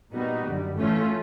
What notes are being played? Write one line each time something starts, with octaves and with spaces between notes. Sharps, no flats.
A#2 G3 B3 D#4 F#4
F#2 D3 G3
A2 E3 A3 C#4 F4